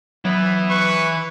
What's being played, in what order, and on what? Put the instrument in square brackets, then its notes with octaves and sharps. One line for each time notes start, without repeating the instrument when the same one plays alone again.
[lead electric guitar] E3 E4 [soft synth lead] F#3 [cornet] B3
[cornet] B4 [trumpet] C#6